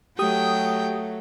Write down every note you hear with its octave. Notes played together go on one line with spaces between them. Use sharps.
F#3 A3 G4 G5 D#6